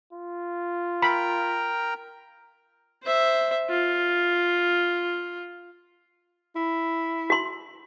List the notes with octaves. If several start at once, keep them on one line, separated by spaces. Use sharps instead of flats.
F4
A#4 G5 A#5 B5
C5 E5
F4
E4
F#4 C6